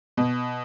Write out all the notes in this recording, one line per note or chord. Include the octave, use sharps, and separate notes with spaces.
B2